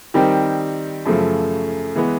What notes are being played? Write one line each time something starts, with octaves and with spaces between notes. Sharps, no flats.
D#3 G3 C4 D#4 G4
F#2 C#3 F3 A3
E3 G#3 B3